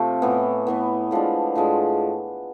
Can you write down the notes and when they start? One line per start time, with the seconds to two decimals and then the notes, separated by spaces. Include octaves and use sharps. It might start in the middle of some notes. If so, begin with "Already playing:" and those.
Already playing: C3 F3 A3
0.22 A2 E3 B3
0.67 A2 E3 B3
1.11 A2 F3 G#3 D4
1.55 A2 F3 G#3 D4